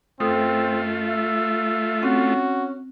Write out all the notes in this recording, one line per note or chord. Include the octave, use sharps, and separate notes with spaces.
F#2 A3 C4 F4 A4 D#6
E5
C4 C#4 F#4 F#5